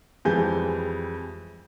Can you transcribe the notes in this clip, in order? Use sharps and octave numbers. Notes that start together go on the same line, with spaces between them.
F2 E3 G3 G#3 G#5 G6